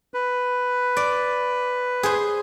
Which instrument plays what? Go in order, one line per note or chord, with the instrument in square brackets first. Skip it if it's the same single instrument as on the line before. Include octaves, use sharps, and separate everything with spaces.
[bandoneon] B4
[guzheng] D5
G#4 C5